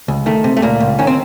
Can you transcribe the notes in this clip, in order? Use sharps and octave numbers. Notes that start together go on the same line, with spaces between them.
C#2
D#3 A3
C3
A3
C#2 A#2 A#3
C#2
D#3 C#4
C4